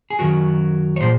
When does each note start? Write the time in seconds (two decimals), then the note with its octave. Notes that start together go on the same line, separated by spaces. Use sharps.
0.10 G#4
0.19 F#2 D#3 F#3 F#4 A#4
0.96 C#5
1.01 A#2 F3 G#4 C5